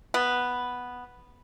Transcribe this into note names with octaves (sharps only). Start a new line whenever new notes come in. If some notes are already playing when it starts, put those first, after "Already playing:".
B3